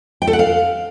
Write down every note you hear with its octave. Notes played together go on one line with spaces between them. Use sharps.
G5
A4
F#5
F5